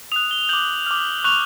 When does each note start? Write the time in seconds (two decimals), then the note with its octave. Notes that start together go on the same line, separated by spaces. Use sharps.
0.12 D#6 F#6 F7
0.31 G7
0.49 D6 G6 F#7
0.86 D6 F6
1.24 C#6 F#6 F7